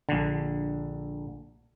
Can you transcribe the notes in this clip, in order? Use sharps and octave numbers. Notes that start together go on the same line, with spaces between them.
A#1 D3